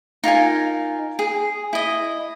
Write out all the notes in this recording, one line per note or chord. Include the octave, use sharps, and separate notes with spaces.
D#4 F4 A#4 G#5
G#4
E4 D#5